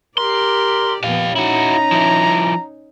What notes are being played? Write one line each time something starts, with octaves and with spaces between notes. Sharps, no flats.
G4 A#4 D5 C6
A#2 F3 B3 G4 F5
C#4 D#4 E4 F#4 A#5
F3 E4